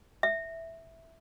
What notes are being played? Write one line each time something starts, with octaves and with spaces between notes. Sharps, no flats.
E5